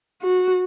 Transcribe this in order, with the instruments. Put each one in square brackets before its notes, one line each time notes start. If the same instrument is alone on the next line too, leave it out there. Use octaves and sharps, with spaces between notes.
[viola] F#4